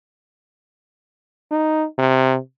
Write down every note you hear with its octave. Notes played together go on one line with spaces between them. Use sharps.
D#4
C3